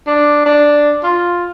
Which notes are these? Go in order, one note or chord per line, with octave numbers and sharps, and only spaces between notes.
D4
D4
F4